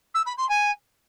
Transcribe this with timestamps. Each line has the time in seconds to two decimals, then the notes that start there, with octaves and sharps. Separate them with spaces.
0.14 E6
0.26 B5
0.37 C6
0.49 G#5